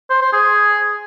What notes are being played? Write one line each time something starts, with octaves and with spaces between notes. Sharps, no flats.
C5
C5
G#4